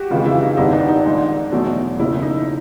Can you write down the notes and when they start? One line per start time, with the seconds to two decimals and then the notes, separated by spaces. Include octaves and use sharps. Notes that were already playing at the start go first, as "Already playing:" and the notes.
Already playing: F#4 G4
0.10 F2 C#3 E3 G#3 F4
0.26 E4
0.42 D#4
0.57 G#1 G2 D#3 G3 B3 D#4
0.73 D4
0.88 D#4
1.05 A#1 G#2 D#3
1.52 E1 E2 B2 F#3 A3
1.99 F#1 E2 C#3 F3 A#3 E4
2.22 D#4